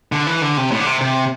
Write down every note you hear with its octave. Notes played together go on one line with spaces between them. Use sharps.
D3
E3
D3
C3
A2
D3
C3
C3